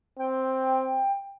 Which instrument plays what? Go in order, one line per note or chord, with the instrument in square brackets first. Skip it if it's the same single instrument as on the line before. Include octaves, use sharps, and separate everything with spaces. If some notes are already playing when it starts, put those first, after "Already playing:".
[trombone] C4 [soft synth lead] G5